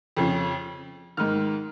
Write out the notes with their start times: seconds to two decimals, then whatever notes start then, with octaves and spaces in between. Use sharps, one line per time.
0.17 F2 C#3 F3
1.17 G#2 D#3 F6